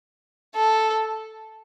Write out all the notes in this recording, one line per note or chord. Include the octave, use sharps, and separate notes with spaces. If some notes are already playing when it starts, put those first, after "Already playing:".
A4